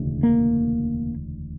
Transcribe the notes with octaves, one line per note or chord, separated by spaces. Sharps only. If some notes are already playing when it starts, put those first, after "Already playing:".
Already playing: E1 D2 C#3
A#3